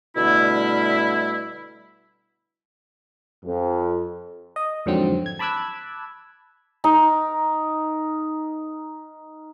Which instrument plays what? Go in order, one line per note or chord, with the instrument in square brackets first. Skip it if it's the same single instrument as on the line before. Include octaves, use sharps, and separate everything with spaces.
[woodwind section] B2 D3 G3 A3 E4
[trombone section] F2
[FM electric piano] D#5
F2 G#2 D3 E3 F#3 C4
G#6
A5 B5 D6 E6 F#6 G#6
[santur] D#4 A#4